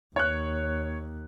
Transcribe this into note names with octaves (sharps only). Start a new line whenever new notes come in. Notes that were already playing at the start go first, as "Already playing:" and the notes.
D#2 C#5 F#6